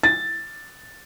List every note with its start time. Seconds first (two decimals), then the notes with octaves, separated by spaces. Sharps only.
0.03 A6